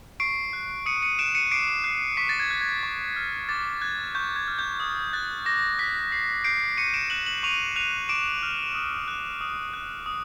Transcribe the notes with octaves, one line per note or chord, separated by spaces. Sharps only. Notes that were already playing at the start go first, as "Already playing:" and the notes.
C#6 C7 D7
F#6
D#6 C#7 D#7
C#7 D#7
F#6 D7 E7
C#7 D#7
D6 C7 D7
F#6 C7
C#6 B6
A6
G#6
F#6
G#6
C#6
F6
D6 A6
F#6 G#6
C#6 G6
G#6
F6
G6
D#6
F#6 A6
D6 A#6
F#6 B6
D#6 C7
G6 C7 D7
C#6 C#7 D#7
D7 E7
F#6 E7 F#7
E7 F#7
C#6 D#7 F7
F#6 D#7 F7
D6 D7 E7
F6
D#6
F#6
D#6
F#6
D#6